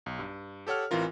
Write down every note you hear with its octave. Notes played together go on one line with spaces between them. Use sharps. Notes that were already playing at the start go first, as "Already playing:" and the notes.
B1
G2
G4 A4 C#5 F#5 F6
A1 E3 C4 F4 A#4